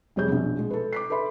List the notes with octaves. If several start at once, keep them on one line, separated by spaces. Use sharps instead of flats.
F1 G3 G#4 C#5 G6
A#1 B2
G#3
A4 B4
D6 B6 C7
A4 B4 E5 B5 C6